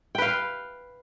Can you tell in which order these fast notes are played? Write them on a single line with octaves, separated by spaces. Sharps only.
G5 B4 F5